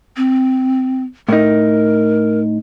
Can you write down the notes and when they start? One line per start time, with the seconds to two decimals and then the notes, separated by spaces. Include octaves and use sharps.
0.17 C4
1.29 A2 D#4 A#4